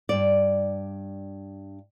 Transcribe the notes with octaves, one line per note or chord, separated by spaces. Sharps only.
G2 D5